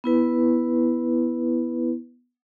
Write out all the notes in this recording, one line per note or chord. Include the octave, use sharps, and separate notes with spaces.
B3 E4 B4